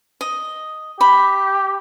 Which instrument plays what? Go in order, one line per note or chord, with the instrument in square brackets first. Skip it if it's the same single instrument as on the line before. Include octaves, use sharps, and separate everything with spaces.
[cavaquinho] D#5
[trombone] G4 [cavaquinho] B5